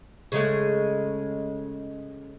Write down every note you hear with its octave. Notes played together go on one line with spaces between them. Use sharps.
C#3 G#3 A3